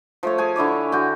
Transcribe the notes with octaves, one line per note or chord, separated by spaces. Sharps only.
F3 A3 C#5
G#4 G#5 A5
D3 E4 C#5 D6
D3 F#4 G5